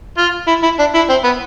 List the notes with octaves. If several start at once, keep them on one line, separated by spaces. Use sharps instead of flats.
F4
E4
E4
D4
E4
C4
B3